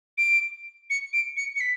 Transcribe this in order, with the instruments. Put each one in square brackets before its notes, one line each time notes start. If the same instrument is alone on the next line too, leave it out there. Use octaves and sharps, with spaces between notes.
[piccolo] D7
C#7
D7
C#7
C#7
B6